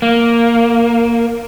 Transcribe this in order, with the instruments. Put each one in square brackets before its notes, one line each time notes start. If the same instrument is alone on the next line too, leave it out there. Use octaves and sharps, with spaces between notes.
[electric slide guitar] A#3